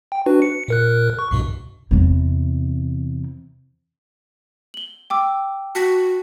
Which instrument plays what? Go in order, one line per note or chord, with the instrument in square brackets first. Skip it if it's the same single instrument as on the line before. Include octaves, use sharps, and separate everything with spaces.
[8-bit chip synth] G5
D4 F#4 B4
C#7
A#2 A#4 F#6
C#6
C2 G2 B2
[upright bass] E2 C3
[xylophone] F#7 G7
G5 D6 E6
[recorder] F#4 [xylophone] A5 A#6 B6